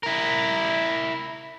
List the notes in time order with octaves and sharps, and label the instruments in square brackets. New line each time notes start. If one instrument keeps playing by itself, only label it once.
[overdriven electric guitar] E4 A#4